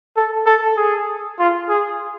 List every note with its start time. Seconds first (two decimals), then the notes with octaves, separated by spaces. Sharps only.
0.17 A4
0.46 A4
0.77 G#4
1.39 F4
1.69 G#4